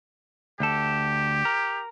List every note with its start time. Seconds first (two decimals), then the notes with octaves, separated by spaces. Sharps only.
0.60 D2 G4 A4
1.45 A#4